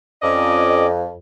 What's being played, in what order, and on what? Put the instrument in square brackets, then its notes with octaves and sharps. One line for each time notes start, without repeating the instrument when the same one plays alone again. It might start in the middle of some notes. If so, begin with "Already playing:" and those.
[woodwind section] F2 [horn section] C#4 D5 D#5